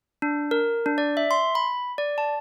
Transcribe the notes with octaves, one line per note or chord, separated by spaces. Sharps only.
D4
A#4
D4
D5
E5
C6
B5
D5
A5